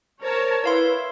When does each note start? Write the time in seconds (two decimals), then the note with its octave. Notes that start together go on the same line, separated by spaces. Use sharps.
0.22 A#4 C5 C#5 A5
0.64 E4 B4 C#5 F5 C6